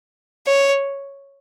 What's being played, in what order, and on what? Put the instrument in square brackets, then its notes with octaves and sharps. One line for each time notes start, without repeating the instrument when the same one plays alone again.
[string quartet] C#5